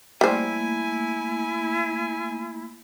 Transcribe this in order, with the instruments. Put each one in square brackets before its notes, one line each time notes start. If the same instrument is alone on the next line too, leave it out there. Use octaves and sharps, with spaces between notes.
[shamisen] G3 C5 [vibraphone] A3 A#3 [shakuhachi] E4 [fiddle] G#5